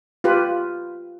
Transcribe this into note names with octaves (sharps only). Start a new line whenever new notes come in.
F4 G4 B4